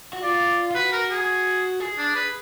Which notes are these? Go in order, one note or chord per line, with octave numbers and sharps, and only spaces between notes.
F#4
F4 D5
F4
F#4 B4
A#4
G#4
G#4
D4
B4